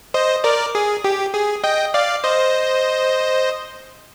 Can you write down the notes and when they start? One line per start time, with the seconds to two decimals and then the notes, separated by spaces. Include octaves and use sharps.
0.14 C5 D#5
0.44 A#4 D5
0.75 G#4
1.04 G4
1.34 G#4
1.64 D#5 G5
1.94 D5 F5
2.24 C5 D#5